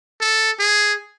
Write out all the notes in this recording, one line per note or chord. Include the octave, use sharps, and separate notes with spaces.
A4
G#4